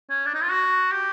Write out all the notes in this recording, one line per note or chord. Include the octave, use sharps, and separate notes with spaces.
C#4
D4
D#4
F4
F#4
G4